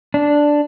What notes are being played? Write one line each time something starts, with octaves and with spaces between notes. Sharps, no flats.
D4